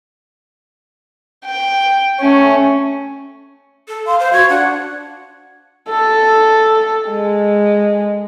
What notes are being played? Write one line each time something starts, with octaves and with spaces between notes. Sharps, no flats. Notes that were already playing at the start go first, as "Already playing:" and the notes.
G5
A3 C#4
A4
F5 C6
C5
F#4 G#6
D4 F#5
A4
G#3